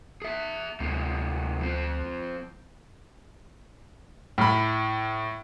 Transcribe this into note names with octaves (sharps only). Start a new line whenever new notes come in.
G#4 E5
D2 C3 G#3 A3
F2 F3 C4
A2 B5